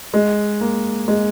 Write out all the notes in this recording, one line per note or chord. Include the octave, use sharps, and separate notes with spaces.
G#3
A#3
G#3